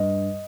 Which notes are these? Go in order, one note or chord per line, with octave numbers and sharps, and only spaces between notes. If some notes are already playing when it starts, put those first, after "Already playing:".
Already playing: G2 D#5